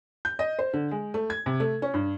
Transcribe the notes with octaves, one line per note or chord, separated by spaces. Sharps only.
G6
D#5
C5
D3
G#3
A3
G#6
C3
A3
C#4
G2